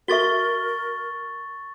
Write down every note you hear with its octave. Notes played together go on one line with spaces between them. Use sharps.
F#4 A4 A#4 E5 C#6 A6 G7